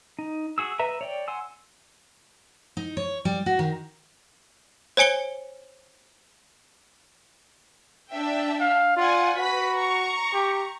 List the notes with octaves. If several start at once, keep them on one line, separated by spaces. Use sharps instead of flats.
D#4
F#4 G#4 E6
B4 E5 A#5
C#5 D5 G5
F#5 G#5 C6 E6
D#4
C#5
G3
F#4
D#3
C5 C#5 G#5 C#7 G7
D4 E5 G5
F5
F4 D5 F#5 G#5
F#4 B4 B5 B6
A#5 C#6
G4